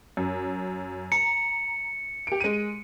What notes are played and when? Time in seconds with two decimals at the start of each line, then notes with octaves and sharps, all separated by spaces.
0.17 F#2
1.12 A#5 C#7
2.27 G4 D7
2.40 G#3 D#7